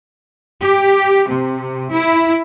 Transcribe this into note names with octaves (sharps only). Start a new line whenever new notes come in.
G4
C3
E4